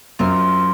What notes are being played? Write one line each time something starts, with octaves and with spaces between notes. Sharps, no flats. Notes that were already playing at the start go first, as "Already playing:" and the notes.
F#2 C4 F4 A#4